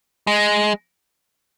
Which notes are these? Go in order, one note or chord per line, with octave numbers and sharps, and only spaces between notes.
G#3